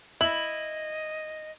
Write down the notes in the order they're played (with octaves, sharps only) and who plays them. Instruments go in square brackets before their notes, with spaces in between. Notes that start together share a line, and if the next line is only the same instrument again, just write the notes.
[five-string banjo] E4 [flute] D#5 [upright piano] F#7